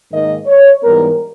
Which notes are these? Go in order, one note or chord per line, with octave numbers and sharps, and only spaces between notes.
G#2 D#3 A#3 D#5
C#5
G#2 E3 G3 B3 A#4